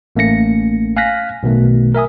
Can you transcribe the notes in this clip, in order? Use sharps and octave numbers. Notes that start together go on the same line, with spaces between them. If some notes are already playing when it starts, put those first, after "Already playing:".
A1 A3 A#3 C#4 A#6 C#7
F5 G#5 F6 F#6 A#6 B6
B1 B2 D#3 A3
A#4 E5 G#5 D#6